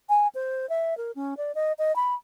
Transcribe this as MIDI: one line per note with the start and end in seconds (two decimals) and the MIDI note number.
0.09 0.28 80
0.35 0.68 72
0.69 0.97 76
0.97 1.11 70
1.15 1.34 61
1.37 1.52 74
1.55 1.73 75
1.78 1.95 75
1.96 2.14 83